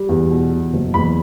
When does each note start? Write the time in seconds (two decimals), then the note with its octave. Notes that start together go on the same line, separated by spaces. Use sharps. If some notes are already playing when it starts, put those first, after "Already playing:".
Already playing: G3
0.09 E2
0.30 B2
0.51 B2
0.73 F#1
0.94 E2 B5